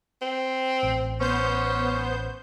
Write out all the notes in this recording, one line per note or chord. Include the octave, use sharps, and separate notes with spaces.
C4
A1
B3 C#4 C5 G6